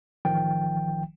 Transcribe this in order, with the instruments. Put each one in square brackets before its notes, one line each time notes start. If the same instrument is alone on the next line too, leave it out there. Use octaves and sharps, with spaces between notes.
[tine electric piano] A1 D#3 F3 G5